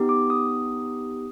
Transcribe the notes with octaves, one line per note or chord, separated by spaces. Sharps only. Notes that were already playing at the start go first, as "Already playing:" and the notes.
Already playing: B3 D#4 G4
D6
D#6